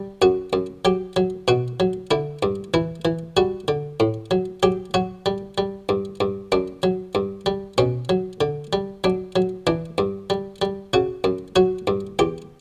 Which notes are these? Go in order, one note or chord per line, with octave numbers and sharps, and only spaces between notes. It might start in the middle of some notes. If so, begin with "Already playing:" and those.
Already playing: G3
F#2 F#4
F#2
F#3 G4
F#3
B2 F#4
F#3
D3 E4
G2
E3 E4
E3
G3 F#4
D3
A2
F#3
F#3 G4
F#3 F#4
G3
G3
G2
G2
F#2 D4
F#3
G2
G3
B2 C#4
F#3
D3
G3
F#3 D4
F#3
E3 D4
G2
G3
G3
C#3 F#4
F#2
F#3 F#4
G2
E2 G4